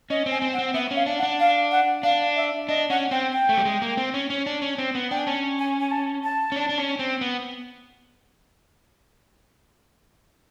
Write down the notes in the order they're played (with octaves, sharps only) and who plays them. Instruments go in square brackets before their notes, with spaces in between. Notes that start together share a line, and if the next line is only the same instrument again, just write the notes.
[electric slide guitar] C#4 [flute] D#5
[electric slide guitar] C4
[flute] G#5
[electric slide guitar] C4
[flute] F#5
[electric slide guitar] C4
[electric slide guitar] B3 [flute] E5
[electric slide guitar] C#4
[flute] F5
[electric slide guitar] D4
[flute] F#5
[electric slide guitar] D4
[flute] F5
F#5
[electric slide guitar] D4 [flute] F5
[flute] E5
[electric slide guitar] D4 [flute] D#5
[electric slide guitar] C#4 [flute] F#5
[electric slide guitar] C4 [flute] G5
[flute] G5
[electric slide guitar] A3
G3
G#3
A#3
C4
C#4
C#4
D4
C#4
C4
B3
[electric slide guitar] D4 [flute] G5
[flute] G#5
[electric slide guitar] C#4 [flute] A5
[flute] G#5
G#5
A5
A5
[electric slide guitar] C#4
D4
D4
C#4
C4
B3